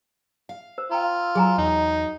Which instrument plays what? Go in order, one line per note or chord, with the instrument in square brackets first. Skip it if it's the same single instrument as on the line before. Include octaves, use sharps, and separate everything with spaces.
[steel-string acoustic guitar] F5
[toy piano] C5 [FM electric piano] E6
[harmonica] F4 [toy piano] G5 A#5
[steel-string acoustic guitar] F#3 [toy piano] G#4 G#5 A#5
[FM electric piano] E2 [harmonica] D#4